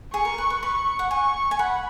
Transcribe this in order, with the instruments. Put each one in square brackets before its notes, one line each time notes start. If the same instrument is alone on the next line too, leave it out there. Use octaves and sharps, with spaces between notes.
[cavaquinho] G#4 [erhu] C#6
[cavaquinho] A#4
B4
B4
[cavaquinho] B4 [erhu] C#6
[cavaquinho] F#5
[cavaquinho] G#5 [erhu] C#6
[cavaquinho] G#5
[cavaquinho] F#5 [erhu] B5